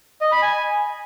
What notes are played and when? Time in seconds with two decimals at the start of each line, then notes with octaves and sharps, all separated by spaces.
0.21 D#5
0.32 B5
0.42 G#5